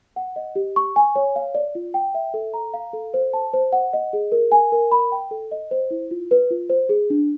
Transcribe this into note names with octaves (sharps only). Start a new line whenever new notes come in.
F#5
D#5
G4
C#6
G#5
C#5
F5
D5
F4
G5
E5
A4
A#5
F5
A4
C5
A5
C5
F#5
D#5
G#4
A#4
G#5
A#4
B5
G5
A4
D#5
C5
E4
F4
B4
F4
C5
G#4
D4